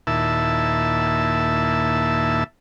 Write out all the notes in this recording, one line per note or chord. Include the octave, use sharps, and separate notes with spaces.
D#2 A#2 E4 E5 A5